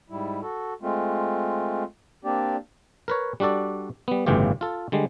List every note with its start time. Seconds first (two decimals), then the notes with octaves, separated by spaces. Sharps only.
0.10 G#2 G3 E4
0.42 F#4 A4
0.82 G#3 A3 C4 F4
2.25 A#3 C4 D4 G4 D5
3.08 A#4 B4 C#5
3.40 G3 D4 F#4 A4 D5
4.08 G3 B3
4.26 G1 A2 C#3 E3 F4 G4
4.61 F4 A4
4.92 D3 G3 G#3